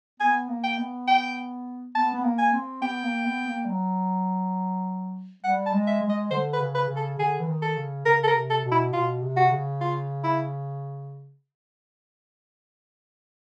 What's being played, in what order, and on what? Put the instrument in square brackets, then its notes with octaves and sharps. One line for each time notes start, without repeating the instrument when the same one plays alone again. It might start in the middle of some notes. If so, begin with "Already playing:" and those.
[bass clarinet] B3 [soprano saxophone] G#5
[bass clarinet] A#3
[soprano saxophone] G5
[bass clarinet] B3
[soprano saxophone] G5
[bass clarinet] B3 [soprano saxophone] A5
[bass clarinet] B3
A#3
[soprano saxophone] G#5
[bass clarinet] C4
[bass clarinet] B3 [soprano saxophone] G5
[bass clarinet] A#3
B3
A#3
G3
F#3
[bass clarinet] G3 [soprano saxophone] F#5
[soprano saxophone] A5
[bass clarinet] G#3
[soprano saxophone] E5
[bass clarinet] G#3
[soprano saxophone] D#5
[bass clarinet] D3 [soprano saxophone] C5
[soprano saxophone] B4
[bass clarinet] C#3
[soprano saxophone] B4
[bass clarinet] C#3
[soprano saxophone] A4
[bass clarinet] D3 [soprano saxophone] G#4
[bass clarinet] E3
D#3
[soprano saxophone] A4
[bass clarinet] C#3
[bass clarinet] C#3 [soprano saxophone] A#4
[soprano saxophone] A4
A#4
[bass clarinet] C3
[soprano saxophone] A4
[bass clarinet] B2
[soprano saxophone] E4
[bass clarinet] B2 [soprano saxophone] F4
[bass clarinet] C3
[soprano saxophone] F#4
[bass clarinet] C#3
[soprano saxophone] F4
E4